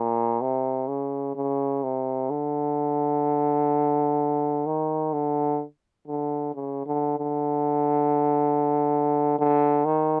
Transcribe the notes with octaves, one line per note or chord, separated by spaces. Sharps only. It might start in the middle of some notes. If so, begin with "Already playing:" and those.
Already playing: A#2
C3
C#3
C#3
C3
D3
D#3
D3
D3
C#3
D3
D3
D3
D#3